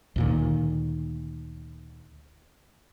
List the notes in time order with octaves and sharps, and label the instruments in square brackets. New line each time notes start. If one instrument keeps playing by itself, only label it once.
[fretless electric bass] D2 A#2 D#3